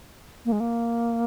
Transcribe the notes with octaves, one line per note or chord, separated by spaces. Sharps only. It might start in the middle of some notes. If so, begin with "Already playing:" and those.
A#3
G#3
A#3